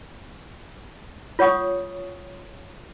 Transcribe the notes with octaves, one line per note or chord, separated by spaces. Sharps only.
F4 C#5 F#5 C#6 D#6